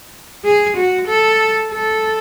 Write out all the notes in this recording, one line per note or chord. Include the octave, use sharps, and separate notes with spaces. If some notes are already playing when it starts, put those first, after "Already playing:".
G#4
F#4
A4
A4